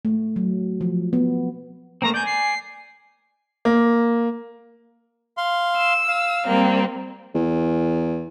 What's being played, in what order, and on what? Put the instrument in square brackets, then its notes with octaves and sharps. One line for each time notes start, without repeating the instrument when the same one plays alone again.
[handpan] A3
F#3
F3
B3
[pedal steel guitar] A3 A#3 C4 [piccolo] A#5
[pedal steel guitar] D5 G#5 [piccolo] G6
[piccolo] C7
[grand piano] A#3
[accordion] F5 C6
[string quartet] E6
[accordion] F5
[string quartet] G3 A#3 C4
[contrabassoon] E2